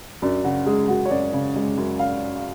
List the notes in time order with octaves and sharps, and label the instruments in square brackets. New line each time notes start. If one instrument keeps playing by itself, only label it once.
[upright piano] F#2 D4
C#3 F#4
G#3 G#4
F#2 F#4
C#5
F#2 D5
C#3
G#3
F#2
F5